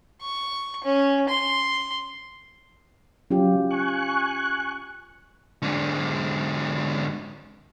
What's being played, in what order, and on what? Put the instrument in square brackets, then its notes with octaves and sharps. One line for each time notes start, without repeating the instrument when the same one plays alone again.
[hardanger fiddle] C#6
C#4
C6
[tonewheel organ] F#3 [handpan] C#4 F4 G4
[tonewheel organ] G#5 C#6 F#6
[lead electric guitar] G#2 D3